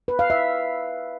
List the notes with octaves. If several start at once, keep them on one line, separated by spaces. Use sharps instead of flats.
B4
F5
E5